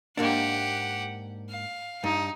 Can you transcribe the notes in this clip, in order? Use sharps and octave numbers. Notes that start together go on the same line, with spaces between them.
G#2 A#3 D4 G4 F#5
F5
G2 D#4